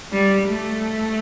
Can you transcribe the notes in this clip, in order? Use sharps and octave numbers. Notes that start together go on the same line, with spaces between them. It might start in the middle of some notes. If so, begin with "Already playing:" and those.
G3
A3